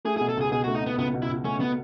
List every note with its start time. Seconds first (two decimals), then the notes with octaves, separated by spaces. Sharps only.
0.05 A3 G#4
0.17 G#4
0.20 B2
0.29 A4
0.37 C#2 G#4
0.52 B2 G#4
0.64 A3 F#4
0.75 D#4
0.83 B2 B3
0.98 C#2 B3
1.14 B2
1.22 E4
1.29 C#2
1.45 A3 C#4
1.60 B3